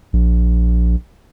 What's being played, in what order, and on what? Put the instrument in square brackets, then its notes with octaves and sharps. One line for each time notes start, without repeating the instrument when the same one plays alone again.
[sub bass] A#1